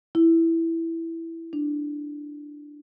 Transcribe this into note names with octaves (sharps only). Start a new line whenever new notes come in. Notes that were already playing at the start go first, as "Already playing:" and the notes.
E4
D4